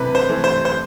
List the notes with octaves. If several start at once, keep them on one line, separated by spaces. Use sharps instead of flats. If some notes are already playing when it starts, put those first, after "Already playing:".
Already playing: C3 E3 A3 B4
C5
E3 A3
C5
C5